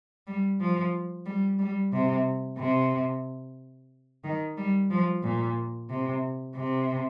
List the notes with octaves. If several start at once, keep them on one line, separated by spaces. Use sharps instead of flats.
G3
F3
G3
G3
C3
C3
D#3
G3
F3
A#2
C3
C3